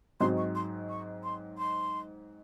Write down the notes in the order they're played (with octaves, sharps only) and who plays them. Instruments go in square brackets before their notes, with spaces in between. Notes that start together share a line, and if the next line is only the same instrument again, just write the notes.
[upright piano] G#2 F#3 C4 D#4 [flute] C6
[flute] C#6
C6
C#6
C6
C6